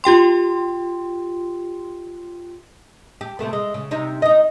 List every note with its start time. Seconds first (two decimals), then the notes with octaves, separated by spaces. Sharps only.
0.04 F4 G4 G5 C6
3.21 G4
3.39 C3 A3 B3
3.53 G#3
3.74 C#3
3.91 C3 D#4
4.22 D#4 D#5